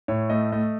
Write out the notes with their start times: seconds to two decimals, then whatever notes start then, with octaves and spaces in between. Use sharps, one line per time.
0.08 A2 C#5
0.30 A3 D#5
0.52 A3 D#5